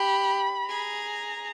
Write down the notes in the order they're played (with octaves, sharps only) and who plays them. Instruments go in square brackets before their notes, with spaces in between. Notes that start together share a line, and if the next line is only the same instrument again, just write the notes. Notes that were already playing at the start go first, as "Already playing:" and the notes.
Already playing: [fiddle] G4 [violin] B5
[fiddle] G#4 [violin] A#5